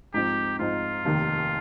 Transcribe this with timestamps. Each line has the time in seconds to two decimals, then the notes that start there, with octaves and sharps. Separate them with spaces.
0.14 G#2 F3 C4 D#4 G4
0.59 G#2 F3 C4 D#4 F4
1.05 F1 D#2 D#3